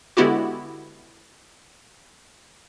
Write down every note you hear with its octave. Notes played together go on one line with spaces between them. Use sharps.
D3 G#3 B3 E4 F#4 G4